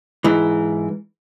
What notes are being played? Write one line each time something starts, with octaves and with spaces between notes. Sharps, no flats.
G#2 E3